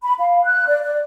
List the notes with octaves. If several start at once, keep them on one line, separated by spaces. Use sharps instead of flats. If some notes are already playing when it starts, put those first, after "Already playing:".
B5
F5
F#6
D5
D5